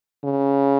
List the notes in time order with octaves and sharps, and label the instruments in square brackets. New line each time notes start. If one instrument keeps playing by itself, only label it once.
[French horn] C#3